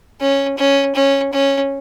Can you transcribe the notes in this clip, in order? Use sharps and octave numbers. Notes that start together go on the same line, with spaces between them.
C#4
C#4
C#4
C#4